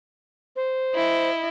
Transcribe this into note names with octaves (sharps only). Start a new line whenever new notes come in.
C5
E4 D#5